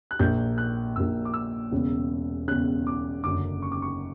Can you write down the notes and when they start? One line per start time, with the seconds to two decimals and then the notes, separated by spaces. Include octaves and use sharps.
0.11 F#6
0.19 A#1 A#2 A#3 G6
0.58 F#6
0.96 A#1 A#2 A#3 E6
1.25 D6
1.34 E6
1.72 E1 E2 C#3
2.48 E1 E2 C#3 F#6
2.87 D6
3.24 F#1 F#2 D3 D6
3.62 C#6
3.72 D6
3.82 C#6